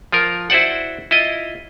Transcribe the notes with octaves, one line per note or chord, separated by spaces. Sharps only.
F3 F4 A#4
E4 F#4 C5 D5 F#5
E4 F4 D#5